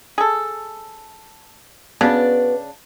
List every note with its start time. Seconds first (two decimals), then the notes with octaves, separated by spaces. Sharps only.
0.18 G#4 A4
2.01 C#3 B3 D4 F#4 D5